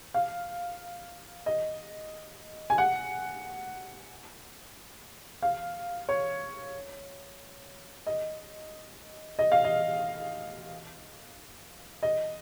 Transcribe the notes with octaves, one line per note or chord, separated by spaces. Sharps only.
F5
D#5
G#5
F#5
F5
C#5
D#5
D#5
F5
D#5
D#5